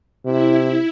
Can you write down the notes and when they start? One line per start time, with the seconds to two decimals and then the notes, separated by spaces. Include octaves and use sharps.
0.25 C3 E4